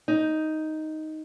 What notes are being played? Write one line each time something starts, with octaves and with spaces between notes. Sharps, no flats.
D#4